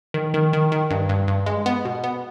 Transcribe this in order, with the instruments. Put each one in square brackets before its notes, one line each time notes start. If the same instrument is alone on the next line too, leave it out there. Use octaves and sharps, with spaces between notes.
[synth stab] D#3
D#3
D#3
D#3
G2
G2
G2
G#3
B3
B2
B3